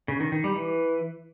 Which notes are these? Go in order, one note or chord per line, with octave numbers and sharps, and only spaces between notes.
C#3
D#3
D#3
G3
E3